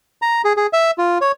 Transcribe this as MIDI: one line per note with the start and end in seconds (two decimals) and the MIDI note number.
0.22 0.42 82
0.45 0.53 68
0.57 0.67 68
0.73 0.91 76
0.98 1.18 65
1.21 1.32 73